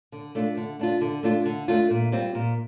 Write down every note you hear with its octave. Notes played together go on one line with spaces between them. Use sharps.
D3
A3 D4 F4
D3
A3 D4 F4
D3
A3 D4 F4
D3
A3 D4 F4
A#2
G3 C4 F4
A#2